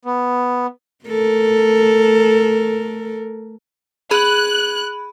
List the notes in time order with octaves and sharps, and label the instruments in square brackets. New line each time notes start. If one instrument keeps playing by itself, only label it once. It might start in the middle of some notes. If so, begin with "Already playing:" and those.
[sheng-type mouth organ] B3
[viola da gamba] A3 A4 A#4
[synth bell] G#4 B5 [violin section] F#6